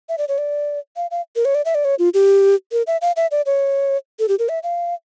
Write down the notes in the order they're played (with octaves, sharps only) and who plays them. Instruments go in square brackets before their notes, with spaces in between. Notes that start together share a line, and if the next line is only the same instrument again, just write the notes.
[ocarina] E5
D5
C#5
D5
F5
F5
A#4
C#5
D5
E5
D5
C#5
F4
G4
A#4
E5
F5
E5
D5
C#5
A4
G4
A#4
E5
F5